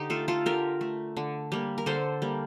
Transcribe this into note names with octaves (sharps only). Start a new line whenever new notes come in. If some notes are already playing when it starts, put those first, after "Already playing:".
Already playing: D3 D#4 G4
A3 F4 A4
F4 A4
D3 G4 A#4
A3
D3
G3 A#3
A#4
D3 A4 C5
G3 A#3